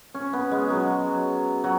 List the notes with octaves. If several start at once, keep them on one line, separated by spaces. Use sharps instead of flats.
C#4
B3
G#3
F#3
F#3